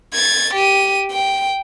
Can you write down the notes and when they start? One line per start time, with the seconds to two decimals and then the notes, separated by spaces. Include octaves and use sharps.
0.14 G#6 A6
0.54 G4 D#7
1.12 G5